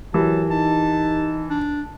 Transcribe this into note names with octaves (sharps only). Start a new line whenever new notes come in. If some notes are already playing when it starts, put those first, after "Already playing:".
E3 F#3 G4 A#4 A5
D#4 A5
D4